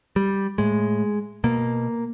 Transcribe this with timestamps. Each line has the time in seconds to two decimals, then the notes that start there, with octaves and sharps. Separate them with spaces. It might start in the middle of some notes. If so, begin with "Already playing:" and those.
0.16 G3
0.58 A2 G#3
1.44 B2 A#3